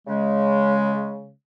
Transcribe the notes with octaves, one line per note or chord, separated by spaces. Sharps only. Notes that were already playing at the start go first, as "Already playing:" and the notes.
C#3 G#3